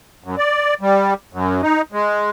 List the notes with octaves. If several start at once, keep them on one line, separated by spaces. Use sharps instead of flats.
F#2
D5
G3
F#2
D#4
G#3